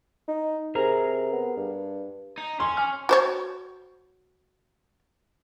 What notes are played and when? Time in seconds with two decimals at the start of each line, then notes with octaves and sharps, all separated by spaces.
0.28 D#4
0.75 C3 G#4 A#4 A#5
1.32 B3
1.56 G2
2.38 D#4
2.60 C#4 C6
2.77 G#5 F6
3.09 F#4 C5 C#5